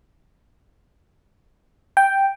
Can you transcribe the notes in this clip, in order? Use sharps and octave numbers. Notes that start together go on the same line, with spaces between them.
G5